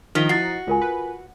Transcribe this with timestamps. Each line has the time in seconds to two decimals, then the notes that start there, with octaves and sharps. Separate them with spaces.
0.15 D#3 F3 D#5 A#5 F6 B6 G7
0.29 E4 F#4 A6 C7
0.67 C#2 F4 A#4 G#5
0.82 B4